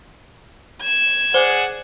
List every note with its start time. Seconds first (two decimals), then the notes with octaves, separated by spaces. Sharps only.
0.81 G#6 E7
1.34 G#4 C5 D5 F#5